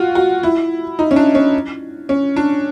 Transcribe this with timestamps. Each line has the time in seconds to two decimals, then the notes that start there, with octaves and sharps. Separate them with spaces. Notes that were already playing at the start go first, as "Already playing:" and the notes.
Already playing: F4 F#4
0.15 F#4
0.43 E4
0.99 D#4
1.11 C#4
1.16 D4
1.35 C#4
2.09 C#4
2.36 D4